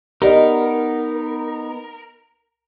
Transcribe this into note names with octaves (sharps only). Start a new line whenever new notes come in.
B3 D#4 G4 A#4 D5 D#5